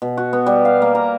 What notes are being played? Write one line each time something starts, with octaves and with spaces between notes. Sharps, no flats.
B2
F#4
B3
G3
F5
A#3
A#5